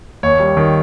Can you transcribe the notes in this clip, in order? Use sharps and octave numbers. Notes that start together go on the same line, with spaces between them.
D#2 C#5
G3
D#3